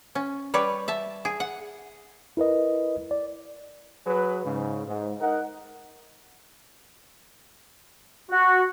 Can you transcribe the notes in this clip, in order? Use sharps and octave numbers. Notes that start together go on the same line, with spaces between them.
C#4
G3 B4 C#5 D5
E5 A5
G#4
F#5
E4 A#4 B4 D#5
D5
F#3 G#4 B4
G#2 C#3
G#2
D#4 A#4 D#5 F#5
F#4